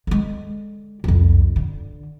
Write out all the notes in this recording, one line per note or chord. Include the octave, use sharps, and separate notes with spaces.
D3 G#3
C2 F2
D3